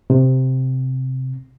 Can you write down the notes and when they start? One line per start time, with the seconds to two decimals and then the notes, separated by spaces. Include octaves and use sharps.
0.10 C3